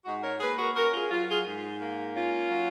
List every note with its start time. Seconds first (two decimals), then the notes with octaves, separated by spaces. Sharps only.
0.05 G#2 D#4 F#4
0.23 A#4 C#5
0.40 A#3 G#4 B4
0.58 F#4 A#4
0.76 C#4 F#4 A#4
0.93 F4 G#4
1.10 F#3 F4
1.28 F4 G#4
1.45 G#2
1.80 A#3
2.15 C#4 F4
2.50 F#3